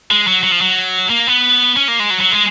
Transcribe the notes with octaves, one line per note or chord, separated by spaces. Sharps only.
G#3
F#3
F#3
F3
F#3
A#3
B3
C#4
A#3
G#3
F#3
F#3
G#3